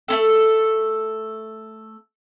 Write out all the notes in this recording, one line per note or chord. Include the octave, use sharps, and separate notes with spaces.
A3 C#4 A4